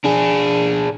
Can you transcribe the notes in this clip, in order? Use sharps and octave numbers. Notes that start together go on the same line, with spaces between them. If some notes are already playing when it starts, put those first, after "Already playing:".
D4 G#4